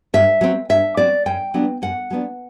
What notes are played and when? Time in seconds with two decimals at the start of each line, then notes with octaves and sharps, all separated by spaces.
0.14 G2 E5
0.41 F#3 C4
0.69 G2 E5
0.97 F#3 C4 D5
1.26 F#2 G5
1.54 F#3 B3 D4
1.82 F#2 F#5
2.10 F#3 B3 D4